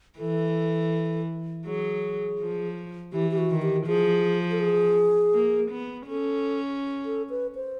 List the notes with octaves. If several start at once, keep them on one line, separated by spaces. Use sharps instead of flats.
E3 A4
F#3 G#4
F3
E3 G4
G4
F#4
D#3
G4
F3 G#4
A4
G#4
A#3
B3
C#4 A4
A4
B4
C5